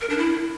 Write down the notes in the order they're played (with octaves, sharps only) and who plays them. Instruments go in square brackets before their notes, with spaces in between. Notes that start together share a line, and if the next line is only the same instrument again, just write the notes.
[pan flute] A#4
D4
E4